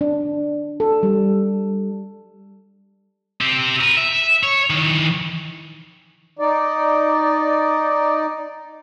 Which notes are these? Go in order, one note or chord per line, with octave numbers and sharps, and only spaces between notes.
D4
A4
G3
C4 G4
A#4 B4
E5
C#5
D#3 E3
D#4 D5